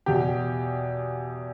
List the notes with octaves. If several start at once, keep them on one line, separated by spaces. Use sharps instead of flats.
E2 B2 G4